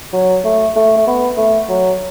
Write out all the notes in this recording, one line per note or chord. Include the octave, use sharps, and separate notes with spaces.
F#3
A3
A3
A3
B3
A3
F#3